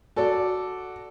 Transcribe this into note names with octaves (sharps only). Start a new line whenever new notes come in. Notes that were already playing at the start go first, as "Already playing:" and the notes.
F#4 A4 D5